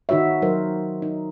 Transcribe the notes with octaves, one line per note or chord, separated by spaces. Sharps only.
D#3 D#4 F#4 C#5 E5
F#3 D#4 A#4 C5
D#4